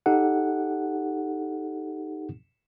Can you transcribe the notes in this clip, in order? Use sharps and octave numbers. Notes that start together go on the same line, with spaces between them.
D#4 G4 A4 F#5